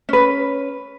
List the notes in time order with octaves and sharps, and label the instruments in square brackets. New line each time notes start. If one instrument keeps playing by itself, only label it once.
[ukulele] C#4 B4